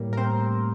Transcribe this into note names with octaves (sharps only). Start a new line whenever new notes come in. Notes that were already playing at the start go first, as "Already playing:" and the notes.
Already playing: A2 G3 A#3
A#4
C4 C5